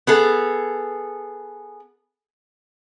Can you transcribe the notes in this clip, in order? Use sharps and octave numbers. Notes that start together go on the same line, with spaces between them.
B3 G#4 A4